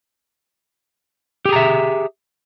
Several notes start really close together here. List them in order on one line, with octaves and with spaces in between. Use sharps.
G4 G#4 A#5 E5